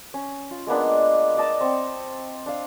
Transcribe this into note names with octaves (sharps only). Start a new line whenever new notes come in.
C#4
F4
G#3 A#3 B3 D4
D5 D#5 A5 E6
C4 C#6
D4 F5